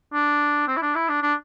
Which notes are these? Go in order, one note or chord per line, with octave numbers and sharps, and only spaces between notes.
D4
C4
E4
D4
E4
D4
D4